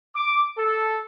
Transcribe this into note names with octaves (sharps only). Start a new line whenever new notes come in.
D6
A4